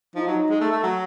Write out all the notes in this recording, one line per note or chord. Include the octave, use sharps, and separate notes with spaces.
F3 D#4
F#3
G#3
A3
A3
F#3